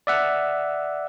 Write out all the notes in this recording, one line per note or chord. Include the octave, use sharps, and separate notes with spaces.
D5 E5 F#5